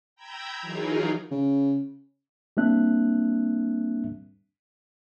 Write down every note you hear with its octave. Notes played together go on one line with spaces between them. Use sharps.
G5 A#5 B5 E6 G6 G#6
E3 F#3 D#4 F4 G#4 A#4
C#3
G3 A#3 C4 D4 E5 F#6